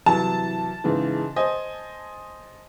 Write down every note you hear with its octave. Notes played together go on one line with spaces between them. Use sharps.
C2 E3 F#3 A5
G#2 C#3 E3
C5 D#5 G#5